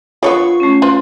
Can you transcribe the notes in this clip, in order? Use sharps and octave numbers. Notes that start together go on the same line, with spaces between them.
D3 F#3 B3 F4 C#5 C#6
A3 C#4
F4 B4 C5